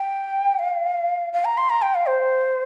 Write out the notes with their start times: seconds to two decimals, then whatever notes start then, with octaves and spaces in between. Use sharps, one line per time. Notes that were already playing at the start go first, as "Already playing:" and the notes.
Already playing: G5
0.59 F5
1.33 F5
1.45 A#5
1.57 C6
1.70 A#5
1.82 G5
1.95 F5
2.07 C5